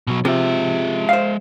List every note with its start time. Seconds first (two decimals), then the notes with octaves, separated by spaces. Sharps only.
0.07 B2 F#3
0.25 C3 F3 G#3 E5
1.09 C5 F5